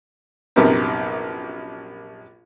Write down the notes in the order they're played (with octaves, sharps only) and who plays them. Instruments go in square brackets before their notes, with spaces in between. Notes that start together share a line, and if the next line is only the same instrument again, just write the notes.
[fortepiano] A#1 F#2 C3 A#3 B3 D#4